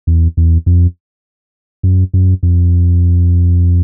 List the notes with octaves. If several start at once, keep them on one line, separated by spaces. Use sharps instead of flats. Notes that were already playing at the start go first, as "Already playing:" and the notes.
E2
E2
F2
F#2
F#2
F2